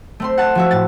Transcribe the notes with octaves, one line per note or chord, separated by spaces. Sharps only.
A3 C4 C6
F#5 A5
F3 F#4 E5
A2 A6